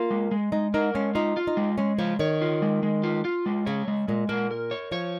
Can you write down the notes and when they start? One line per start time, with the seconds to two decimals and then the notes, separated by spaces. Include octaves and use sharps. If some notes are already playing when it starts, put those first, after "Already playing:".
Already playing: A#3 F4
0.11 G#3
0.31 G#3
0.52 G#3 D#4
0.74 D#4 A#4
0.94 G#3 C#4
1.15 D#4 F4
1.37 F4
1.47 D#4
1.57 G#3
1.78 G#3 C#4
1.98 F3 C#5
2.19 D#3 C#5
2.42 F4
2.62 G#3
2.83 G#3
3.03 F4
3.25 F4
3.46 G#3
3.66 C#3 C#5
3.88 G#3
4.08 A#2 G#3
4.29 A#2 A#4
4.51 A#4
4.71 C#5
4.92 F3 C#5